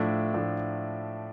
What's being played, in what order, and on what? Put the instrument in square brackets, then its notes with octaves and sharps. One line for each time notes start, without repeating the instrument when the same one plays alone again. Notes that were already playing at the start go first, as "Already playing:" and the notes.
Already playing: [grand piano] A2 F3 A3 D4
A2 F3 A3 D4